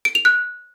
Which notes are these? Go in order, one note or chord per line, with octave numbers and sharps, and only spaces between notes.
D7
F7
F#6